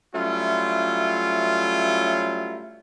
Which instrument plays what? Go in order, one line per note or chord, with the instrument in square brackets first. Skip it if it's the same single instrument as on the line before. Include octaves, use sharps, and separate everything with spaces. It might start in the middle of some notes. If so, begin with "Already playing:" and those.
[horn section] F#3 G3 A3 C#4 E4 F4